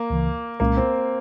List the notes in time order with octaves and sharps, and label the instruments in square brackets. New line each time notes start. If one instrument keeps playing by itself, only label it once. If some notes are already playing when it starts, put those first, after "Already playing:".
Already playing: [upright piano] A#3
[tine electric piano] C#2 C#3 E3
[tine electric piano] C2 A#2 G#3 C#4 [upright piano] A#3
[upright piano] C4